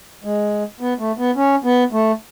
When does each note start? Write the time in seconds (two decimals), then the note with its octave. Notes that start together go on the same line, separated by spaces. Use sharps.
0.24 G#3
0.80 B3
0.99 A3
1.18 B3
1.36 C#4
1.64 B3
1.92 A3